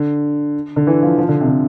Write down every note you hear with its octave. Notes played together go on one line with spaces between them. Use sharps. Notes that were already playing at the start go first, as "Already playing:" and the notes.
Already playing: D3
D3
E3
F3
F3
D3
C3
D3